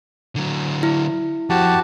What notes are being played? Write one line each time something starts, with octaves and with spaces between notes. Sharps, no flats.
D3 F#3
E4
F2 F#4 G4 A5